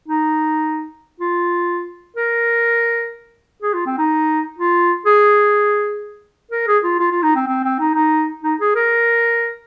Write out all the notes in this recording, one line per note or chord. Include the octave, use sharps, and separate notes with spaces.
D#4
F4
A#4
G#4
F4
C4
D#4
F4
G#4
A#4
G#4
F4
F4
F4
D#4
C4
C4
C4
D#4
D#4
D#4
G#4
A#4